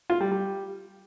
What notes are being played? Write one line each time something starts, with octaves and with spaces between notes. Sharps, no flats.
F4
G3
G3